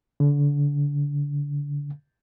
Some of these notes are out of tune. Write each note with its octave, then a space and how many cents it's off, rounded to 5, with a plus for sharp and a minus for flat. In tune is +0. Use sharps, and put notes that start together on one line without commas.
D3 -30